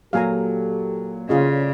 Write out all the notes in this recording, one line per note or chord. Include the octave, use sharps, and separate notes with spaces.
A#2 F#3 G4 A4 F5 G#5 A#5
A2 C#3 C#4 F4 G#4 D5 D#5